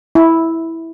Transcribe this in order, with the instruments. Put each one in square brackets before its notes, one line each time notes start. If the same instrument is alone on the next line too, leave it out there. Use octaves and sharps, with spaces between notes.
[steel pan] E4